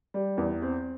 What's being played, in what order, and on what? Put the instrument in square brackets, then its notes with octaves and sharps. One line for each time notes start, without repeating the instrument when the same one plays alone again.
[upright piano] G3
E2
C4